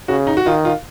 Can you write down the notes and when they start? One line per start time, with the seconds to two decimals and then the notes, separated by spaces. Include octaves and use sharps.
0.08 C#3 F#4
0.27 D#4
0.37 F#4
0.46 D#3 F4
0.65 F4